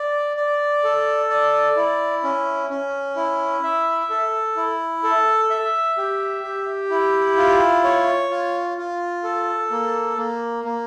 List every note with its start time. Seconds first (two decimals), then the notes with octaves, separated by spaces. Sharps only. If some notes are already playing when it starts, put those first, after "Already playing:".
Already playing: D5
0.37 D5
0.84 A4
1.30 D5
1.76 E4
2.24 C#4
2.70 C#4
3.16 E4
3.63 E5
4.10 A4
4.56 E4
5.04 A4
5.50 E5
5.97 G4
6.43 G4
6.90 E4
7.37 F4
7.84 C#5
8.30 F4
8.78 F4
9.24 A4
9.71 A#3
10.17 A#3
10.64 A#3